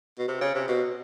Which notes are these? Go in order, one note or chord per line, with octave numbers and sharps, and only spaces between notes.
B2
C3
C#3
C3
B2